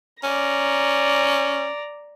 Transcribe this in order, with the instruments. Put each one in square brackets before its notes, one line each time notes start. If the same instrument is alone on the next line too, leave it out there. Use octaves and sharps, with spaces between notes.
[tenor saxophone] C#4 [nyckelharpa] D5 A#5